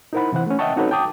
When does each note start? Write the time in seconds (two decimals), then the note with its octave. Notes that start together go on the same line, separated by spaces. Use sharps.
0.13 D#4 E4 A#4 C5 F#5 B5
0.32 C3 E3 C5 F#5
0.46 A3 C#4
0.59 D#5 E5 F#5 G5 A5 C#6
0.76 C4 D#4 F#4 A4 B4 C#5
0.91 G5 A5 D6 D#6